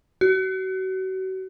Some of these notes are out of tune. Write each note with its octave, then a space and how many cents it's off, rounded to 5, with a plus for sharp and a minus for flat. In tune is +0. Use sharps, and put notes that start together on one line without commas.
F#4 +35